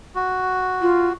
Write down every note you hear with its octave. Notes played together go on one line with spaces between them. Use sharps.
F#4
F4